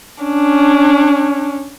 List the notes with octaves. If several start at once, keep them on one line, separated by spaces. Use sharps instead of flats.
C#4 D4